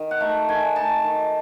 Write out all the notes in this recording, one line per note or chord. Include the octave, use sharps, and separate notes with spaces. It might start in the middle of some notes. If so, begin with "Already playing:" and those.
Already playing: D#3
F#5
A3 D#4 E5
D#3 G#5
A3 D#4 A5
D#3